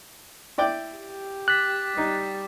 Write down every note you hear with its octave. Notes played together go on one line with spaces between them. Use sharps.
E4 D5 G5
G4
D6 F#6 A6 B6
G3 D#4